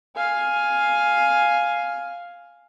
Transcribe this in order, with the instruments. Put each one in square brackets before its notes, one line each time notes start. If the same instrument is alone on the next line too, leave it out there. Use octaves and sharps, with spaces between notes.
[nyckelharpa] F5 G#5